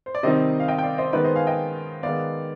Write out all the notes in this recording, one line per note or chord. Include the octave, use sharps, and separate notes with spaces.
C5
D5
C3 D#3 G3 C4 D#4 C5 D#5
F5
D#5 G5
G5
D5 F5
C5 D#5
G#2 D#3 B3 D#4 B4 D5
C5 D#5
F5 G#5
D#5 G5
G#2 D#3 B3 D5 F5